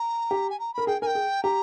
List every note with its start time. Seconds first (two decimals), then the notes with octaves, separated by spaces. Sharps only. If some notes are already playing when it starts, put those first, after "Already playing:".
Already playing: A#5
0.31 G4
0.50 G#5
0.59 A#5
0.74 A#4 B5
0.87 G#4 G5
1.02 A#4 G#5
1.07 G5
1.15 G#4
1.43 G4 A#5